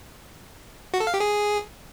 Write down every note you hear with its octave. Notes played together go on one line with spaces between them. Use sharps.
F#4
A4
F5
G4
G#4